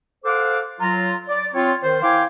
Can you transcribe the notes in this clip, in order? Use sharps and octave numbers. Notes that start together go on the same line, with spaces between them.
A4 C5 F5 F#5 D6
F#3 F4 A#5
D5
C4 F4 C#5
D#3 C5
E4 F5 G5 G#5 C6 D6